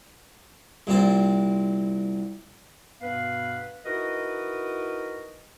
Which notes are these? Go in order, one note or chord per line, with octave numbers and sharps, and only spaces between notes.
C2 A#2 C4 D5
G2 B2 B3 B4 F5
D#4 E4 F#4 A#4 B4 D#5